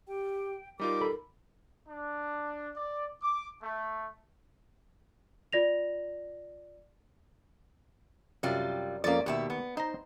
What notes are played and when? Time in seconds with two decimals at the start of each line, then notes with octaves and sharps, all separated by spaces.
0.08 G4 G5
0.80 G3 D#4 F4 A#4 D6
1.01 A4 B5
1.88 D4
2.75 D5
3.22 D6
3.62 A3
5.53 F4 D5 A#6 F7
8.43 F#2 C3 G3 F4
9.04 F2 A#3 C#4 D5
9.26 D#2 B2 G4 E5
9.50 B3
9.77 D#4 C5 A#5